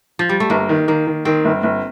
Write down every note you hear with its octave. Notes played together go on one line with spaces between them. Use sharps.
F3
G3
A3
G1 A#3
D#3
D#3 A#3
D#3
D#3 C4
G1
G1